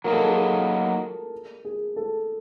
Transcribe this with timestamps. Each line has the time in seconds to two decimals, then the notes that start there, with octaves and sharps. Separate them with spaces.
0.04 F#3 A#3 D#4 A#4
0.13 A4
0.23 G#4
0.30 A4
1.65 G#4
1.96 A4